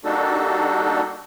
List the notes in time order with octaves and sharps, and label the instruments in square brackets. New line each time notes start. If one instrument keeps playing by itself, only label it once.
[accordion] G3 A#3 D4 D#4 F#4 A4